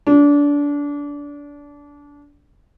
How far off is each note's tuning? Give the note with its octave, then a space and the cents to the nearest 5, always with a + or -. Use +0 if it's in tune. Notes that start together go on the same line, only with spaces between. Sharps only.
D4 -25